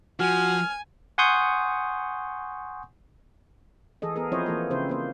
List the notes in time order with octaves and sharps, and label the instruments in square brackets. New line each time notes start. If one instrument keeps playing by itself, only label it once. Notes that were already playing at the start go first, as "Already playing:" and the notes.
[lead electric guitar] F3 [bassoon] F#4 [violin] G#5 [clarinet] F6
[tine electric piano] F#5 G#5 C6 C#6 D#6 G6
[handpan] E3 G#4 A4 D#5
B3 G#4 A#4
F3 C4 E4 C5 C#5 D#5
E3 A#3 A4
C#3 C4 E4 C5
A#3 C5